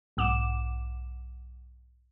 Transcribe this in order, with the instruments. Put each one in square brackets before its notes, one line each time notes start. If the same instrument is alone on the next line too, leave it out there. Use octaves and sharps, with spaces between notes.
[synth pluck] B1 G#2 F#5 D6 E7